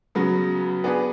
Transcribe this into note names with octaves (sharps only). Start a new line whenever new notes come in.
C#3 F#3 B3
B3 D4 G#4 B4